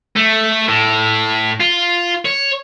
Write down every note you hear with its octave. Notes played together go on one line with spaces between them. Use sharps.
A3
A2
F4
C#5